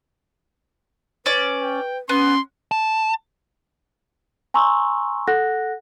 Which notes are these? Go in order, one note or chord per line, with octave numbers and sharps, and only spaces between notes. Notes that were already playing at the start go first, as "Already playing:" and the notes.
C#4 B4 D5
G5
B3 C#4 C6
A5
G#5 A#5 C6 C#6 E6
A4 F#5 F#6 A#6